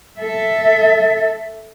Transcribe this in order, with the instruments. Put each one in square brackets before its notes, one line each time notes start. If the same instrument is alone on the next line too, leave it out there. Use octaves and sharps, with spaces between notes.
[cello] A4 E5